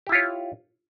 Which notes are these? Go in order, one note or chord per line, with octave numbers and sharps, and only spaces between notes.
E4 F4 G4 C#5